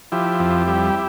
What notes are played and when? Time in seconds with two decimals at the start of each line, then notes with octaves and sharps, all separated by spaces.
0.12 F3 E4 G4
0.39 F2
0.68 G3